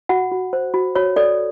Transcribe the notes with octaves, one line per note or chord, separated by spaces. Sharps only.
F#4 F#5
F#4
C5
F#4
F#4 C#5
A4 D5